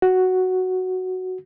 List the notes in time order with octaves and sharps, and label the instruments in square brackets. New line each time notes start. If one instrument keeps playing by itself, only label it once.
[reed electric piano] F#4